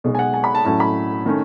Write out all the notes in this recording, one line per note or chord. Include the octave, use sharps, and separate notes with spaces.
B1 B2 G#3
G#5
F#5
G#5
B5
A5
A2 F#3 C#4 E4 A5
B5
D#3 A3 C#4